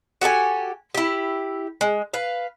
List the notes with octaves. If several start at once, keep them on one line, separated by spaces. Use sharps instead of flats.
F#4 G4 A4 G#5
E4 G4
G#3
B4 F5